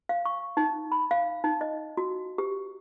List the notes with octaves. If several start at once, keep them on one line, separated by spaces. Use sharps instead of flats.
F5
C#6
D#4
B5
F5
D#4
D#5
F#4
G4